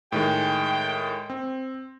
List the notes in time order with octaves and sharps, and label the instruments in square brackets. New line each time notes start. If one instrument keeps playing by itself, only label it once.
[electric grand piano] A2 D#3 G#3 [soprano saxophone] G5
[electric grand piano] C4